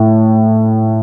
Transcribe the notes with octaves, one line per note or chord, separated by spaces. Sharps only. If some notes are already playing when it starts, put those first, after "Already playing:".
Already playing: A2